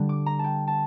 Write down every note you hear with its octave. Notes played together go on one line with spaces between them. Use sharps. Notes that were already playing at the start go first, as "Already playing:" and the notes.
Already playing: D3 G3 D4
D6
A#5
A5
G5
A5